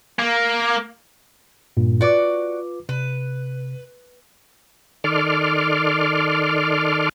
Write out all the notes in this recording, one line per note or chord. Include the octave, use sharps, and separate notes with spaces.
A#3
G2 A#2
F4 F#4 B4 D5 D6
C3 B4
D#3 A4 D5 C6 D6 F6